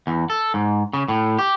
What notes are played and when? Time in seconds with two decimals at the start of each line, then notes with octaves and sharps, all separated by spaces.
0.07 E2
0.30 A4
0.54 G#2
0.93 C#3
1.08 A2
1.38 G4